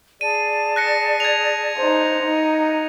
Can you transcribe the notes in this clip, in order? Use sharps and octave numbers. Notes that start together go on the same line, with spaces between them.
G#4 D5 A5 D#7
F#6 A#6 C#7
G#6 F7
D#4 C5
D#4